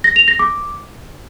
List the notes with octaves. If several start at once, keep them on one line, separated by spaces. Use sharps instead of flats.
A#6
F7
A#6
D6